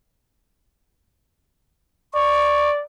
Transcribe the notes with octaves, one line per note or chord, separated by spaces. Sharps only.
D5 C#6